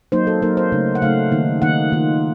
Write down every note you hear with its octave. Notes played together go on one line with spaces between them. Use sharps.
F#3 A#3 D#4 C5
A4
F#3 A#3 D#4 A#4
C5
C#3 A3 D#4
F#5
C#3 A3 D#4 F5
D#3 A#3 D#4
D#3 A#3 D#4 F#5
D#3 A#3 F4